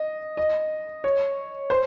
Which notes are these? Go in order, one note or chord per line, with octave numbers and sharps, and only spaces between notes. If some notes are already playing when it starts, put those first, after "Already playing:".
Already playing: D#5
D#5
C#5
C5